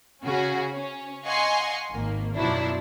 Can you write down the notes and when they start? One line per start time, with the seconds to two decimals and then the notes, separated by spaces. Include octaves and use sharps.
0.24 C#3 C#4 F#4 G#4
0.76 C#4
1.25 D#5 F5 F#5 G#5 C6 C#6
1.93 G#1 D#3 A#3
2.37 F#2 B2 F3 F#3 D4 E4